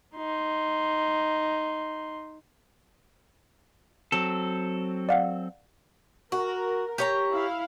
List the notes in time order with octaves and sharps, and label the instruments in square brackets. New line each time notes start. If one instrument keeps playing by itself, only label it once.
[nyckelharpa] D#4 C6
[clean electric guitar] F#3 C4 A4
[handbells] D5 F5 F#5
[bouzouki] F#4 [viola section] A#4
[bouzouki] G4 C#5 A#5
[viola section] E4 F5